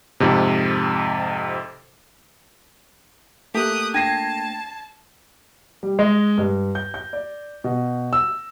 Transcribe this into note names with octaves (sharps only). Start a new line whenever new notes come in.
F2 G#2 C3
A3 A#3 G4 D#6 F#6 B6 D#7
D4 G5 A5 G#6 A#6 C7 D#7
G3
G#3
G2
G6
G6
D5
B2
E6